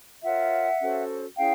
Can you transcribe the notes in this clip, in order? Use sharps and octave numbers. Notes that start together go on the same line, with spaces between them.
F4 A#4 C#5 E5 F#5
C#4 F#4 A4 C5
C#4 E4 G#4 F5 G5